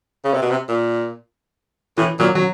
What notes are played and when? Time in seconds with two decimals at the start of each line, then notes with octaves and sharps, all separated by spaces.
0.25 C#3
0.34 C3
0.42 B2
0.51 C3
0.68 A#2
1.98 A2 E3
2.20 A#2 F#3
2.35 F#3